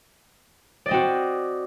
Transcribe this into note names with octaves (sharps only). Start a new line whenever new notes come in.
C4 F#4 D5 D#5